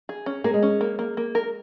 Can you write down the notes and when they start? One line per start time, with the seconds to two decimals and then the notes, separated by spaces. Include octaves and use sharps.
0.09 G#4
0.26 C#4
0.44 A#3 G#4
0.54 G#3
0.62 C#4
0.81 A#3
0.99 A#3
1.17 A#3
1.35 A#4